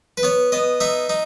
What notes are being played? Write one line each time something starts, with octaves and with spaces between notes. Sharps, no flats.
B4
B3 C#5
B3 D#5
D#4 E5
D#4